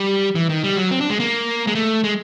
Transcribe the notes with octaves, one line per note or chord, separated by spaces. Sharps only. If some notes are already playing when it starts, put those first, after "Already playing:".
Already playing: G3
E3
D#3
G3
F#3
C4
D4
G#3
A#3
G#3
A3
G#3